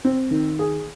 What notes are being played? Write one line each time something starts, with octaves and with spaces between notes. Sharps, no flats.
C4
D#3
G#4